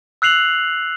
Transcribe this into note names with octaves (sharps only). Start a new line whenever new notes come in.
E6 F#6 C7 F7 F#7